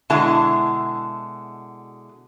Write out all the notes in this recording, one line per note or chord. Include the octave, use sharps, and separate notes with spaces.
B2 D3 G#3 E4 A5